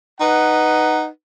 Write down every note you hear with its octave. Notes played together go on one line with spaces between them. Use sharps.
D#4 B4 F#5